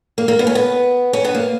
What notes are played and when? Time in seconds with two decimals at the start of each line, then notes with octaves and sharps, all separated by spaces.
0.18 A#3
0.28 A#3
0.39 B3
0.47 C#4
0.55 B3
1.13 C#4
1.25 B3
1.35 A#3